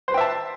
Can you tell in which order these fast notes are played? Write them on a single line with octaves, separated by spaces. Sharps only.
C5 B4 G5 E5 A5